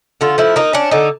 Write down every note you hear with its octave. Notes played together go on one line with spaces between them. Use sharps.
D3 F4
F3 E4
A#3 D#4
C#4 D4
D3 D#4